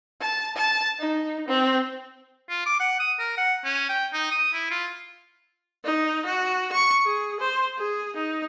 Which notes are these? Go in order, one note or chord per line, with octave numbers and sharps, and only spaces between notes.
A5
A5
D#4
C4
F4
D6
F#5
D#6
A#4
F#5
C#4
G5
D#4
D#6
E4
F4
D#4
F#4
C#6
G#4
C5
G#4
D#4